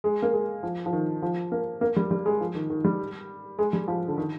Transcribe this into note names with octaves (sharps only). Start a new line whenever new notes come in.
G#3
A#3
G#3
F3
F3
D#3
F3
A#3
A#3
G3
G3
G#3
F3
D#3
D#3
G3
G#3
G3
F3
D3
D#3